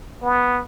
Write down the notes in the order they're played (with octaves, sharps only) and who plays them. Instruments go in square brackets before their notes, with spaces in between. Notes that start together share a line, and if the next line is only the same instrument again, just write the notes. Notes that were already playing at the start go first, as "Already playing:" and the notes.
[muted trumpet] B3